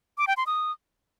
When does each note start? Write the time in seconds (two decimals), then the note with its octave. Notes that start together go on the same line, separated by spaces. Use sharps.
0.18 D6
0.27 G5
0.37 C6
0.47 D#6